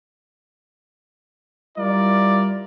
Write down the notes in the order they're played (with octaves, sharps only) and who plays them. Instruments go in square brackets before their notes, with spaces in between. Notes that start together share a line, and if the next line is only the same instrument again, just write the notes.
[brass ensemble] G3 E4 F4 A#4 D5